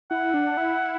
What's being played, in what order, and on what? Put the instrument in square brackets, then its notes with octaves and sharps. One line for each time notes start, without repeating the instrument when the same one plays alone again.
[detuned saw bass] E4 [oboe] F#5
[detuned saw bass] D4
E4